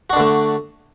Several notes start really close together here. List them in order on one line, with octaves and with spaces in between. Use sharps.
F#4 D4 D3 A3